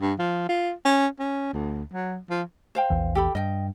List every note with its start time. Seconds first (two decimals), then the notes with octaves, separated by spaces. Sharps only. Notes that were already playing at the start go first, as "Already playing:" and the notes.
0.01 G2
0.19 F3
0.49 F4
0.85 C#4
1.19 C#4
1.53 D2
1.93 F#3
2.30 F3
2.75 C5 F5 G5
2.90 A#1 E2 E3
3.15 G4 A4 B5
3.35 G2 D#5 G5